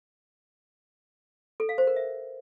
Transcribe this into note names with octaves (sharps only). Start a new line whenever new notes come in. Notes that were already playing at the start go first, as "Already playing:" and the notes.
A4
F5
C5
A#4
E5